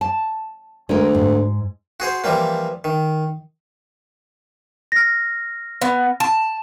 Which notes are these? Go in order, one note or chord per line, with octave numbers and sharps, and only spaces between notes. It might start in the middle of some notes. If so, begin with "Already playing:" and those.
A5
D2 G#3 A#4
G#2
F#4 G#4 C5
E3 F3 G3 A#3
D#3
F6 A#6
B3
A5